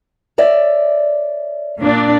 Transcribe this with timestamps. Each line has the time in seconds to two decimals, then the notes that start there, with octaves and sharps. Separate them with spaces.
0.38 C#5 D5 E5
1.78 A#2 D4